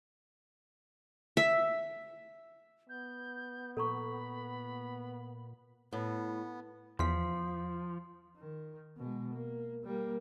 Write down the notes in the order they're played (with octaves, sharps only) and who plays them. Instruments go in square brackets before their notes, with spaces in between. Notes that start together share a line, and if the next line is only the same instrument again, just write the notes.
[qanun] E5
[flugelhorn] B3 [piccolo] G6
[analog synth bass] A#2 [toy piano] A4 A#5 C#6 [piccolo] B5
[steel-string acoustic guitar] A2 [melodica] B3
[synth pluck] E2 B6 [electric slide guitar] F3 [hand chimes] C6
[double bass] D#3
B2 G#3
A#3
G3 A#3